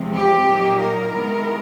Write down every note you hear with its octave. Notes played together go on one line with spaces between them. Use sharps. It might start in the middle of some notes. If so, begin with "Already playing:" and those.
Already playing: E2 C3 F3 G#3 C4
G4
A#2 F#3 A#3 D#4
A#4
C3 D#3 G#3 B3 E4